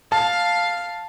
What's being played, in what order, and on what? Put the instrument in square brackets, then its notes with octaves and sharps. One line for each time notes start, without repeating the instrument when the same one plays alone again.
[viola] F5 [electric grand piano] A5